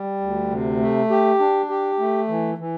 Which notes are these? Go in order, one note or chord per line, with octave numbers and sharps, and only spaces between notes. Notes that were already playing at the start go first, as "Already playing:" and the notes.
Already playing: G3
D2
C3
A3
G4
D4
G4
A3
E3
E3